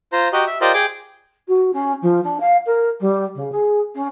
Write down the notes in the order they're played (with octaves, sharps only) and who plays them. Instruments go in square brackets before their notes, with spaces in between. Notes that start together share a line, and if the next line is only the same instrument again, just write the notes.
[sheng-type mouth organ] F4 C5 A#5
F#4 G4 D#5 A#5
E5
F4 G4 A#4 C5 D5 D#5
G#4 G5 D6
[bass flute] F#4
C#4
F3
D4
F5
A#4
G3
C#3
G#4
C#4